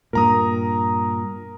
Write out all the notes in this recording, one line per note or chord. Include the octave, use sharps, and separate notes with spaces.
G2 A#2 A#4 A#5 D#6